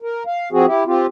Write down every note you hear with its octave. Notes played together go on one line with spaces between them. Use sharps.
A#4
F5
F3 C4 F#4 G#4
E4 G4
C4 F4 G4